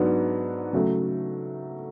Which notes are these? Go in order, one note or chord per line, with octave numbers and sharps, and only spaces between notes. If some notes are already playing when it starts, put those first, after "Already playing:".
Already playing: G#2 F#3 B3 D4
C#3 F#3 A3